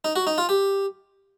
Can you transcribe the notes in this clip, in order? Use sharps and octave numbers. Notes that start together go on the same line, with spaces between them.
D#4
F#4
D#4
F4
G4